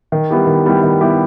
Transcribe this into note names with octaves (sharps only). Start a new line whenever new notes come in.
D#3
G3 B3 E4 G4
D#3
G3 B3 E4 G4
D#3
G3 B3 E4 G4